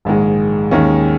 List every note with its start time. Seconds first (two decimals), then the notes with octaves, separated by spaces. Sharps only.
0.05 A#1 G#2 D#3 G#3
0.71 D#2 D#3 G#3 C#4